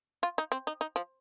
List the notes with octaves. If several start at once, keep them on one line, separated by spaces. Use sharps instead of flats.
F4
D#4
C4
D#4
D#4
F3